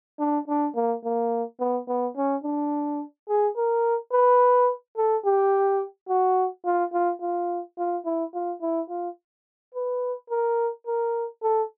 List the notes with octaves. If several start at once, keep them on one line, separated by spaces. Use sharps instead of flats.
D4
D4
A#3
A#3
B3
B3
C#4
D4
G#4
A#4
B4
A4
G4
F#4
F4
F4
F4
F4
E4
F4
E4
F4
B4
A#4
A#4
A4